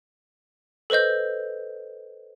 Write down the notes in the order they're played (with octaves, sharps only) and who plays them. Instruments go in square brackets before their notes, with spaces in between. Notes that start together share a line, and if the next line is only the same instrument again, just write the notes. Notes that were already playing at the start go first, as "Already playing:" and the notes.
[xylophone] A4 B4 C5 D#5 G6